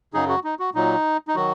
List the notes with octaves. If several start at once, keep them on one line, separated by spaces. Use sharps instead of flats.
F#2 C#3 F#3 D#4 G#4
F#4
D#4
F#4
A#2 F#3 D#4
D#4
D#3 F#3 F#4